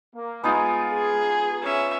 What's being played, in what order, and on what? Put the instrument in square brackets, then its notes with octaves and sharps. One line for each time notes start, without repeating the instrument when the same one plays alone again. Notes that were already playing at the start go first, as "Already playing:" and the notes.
[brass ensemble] A#3
[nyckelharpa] G#3 [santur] B3 D#4 F4 [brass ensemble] G#5
[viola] G#4
[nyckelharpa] C#4 E5